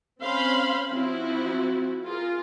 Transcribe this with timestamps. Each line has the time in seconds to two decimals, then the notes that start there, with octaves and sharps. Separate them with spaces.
0.21 C4 C#4 C5 F5 B5 C6
0.89 F3 C4 E4 F#4
2.04 F4 G#4 A#4